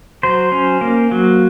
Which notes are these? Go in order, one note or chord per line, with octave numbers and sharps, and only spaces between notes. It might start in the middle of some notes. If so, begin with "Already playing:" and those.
F#3 C5
C#4
A#3
F#3